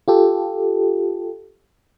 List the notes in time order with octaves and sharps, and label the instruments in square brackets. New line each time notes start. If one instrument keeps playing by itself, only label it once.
[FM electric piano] F4 G4 A4